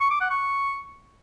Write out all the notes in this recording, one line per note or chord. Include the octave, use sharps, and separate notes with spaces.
C#6
D6
F#5
C#6